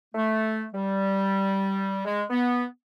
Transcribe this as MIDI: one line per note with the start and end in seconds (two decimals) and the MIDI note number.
0.14 0.65 57
0.73 1.99 55
2.05 2.22 56
2.30 2.64 59